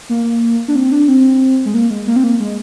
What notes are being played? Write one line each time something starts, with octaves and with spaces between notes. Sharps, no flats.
A#3
D4
C4
D4
C4
G#3
A#3
G#3
A#3
C4
A#3
G#3